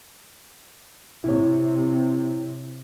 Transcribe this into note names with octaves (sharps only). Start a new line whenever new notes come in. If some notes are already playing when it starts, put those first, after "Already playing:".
C3 E4 C#5